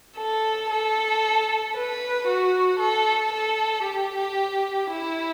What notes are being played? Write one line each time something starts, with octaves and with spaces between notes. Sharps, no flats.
A4
A4
B4
F#4
A4
A4
G4
E4